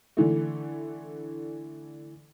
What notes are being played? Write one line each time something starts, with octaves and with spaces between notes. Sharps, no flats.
D3 E3 A3